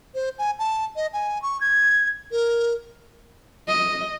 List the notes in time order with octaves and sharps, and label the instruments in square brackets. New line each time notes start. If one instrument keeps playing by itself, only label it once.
[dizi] C5
G#5
A5
D#5
G#5
C#6
G#6
A#4
[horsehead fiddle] D#5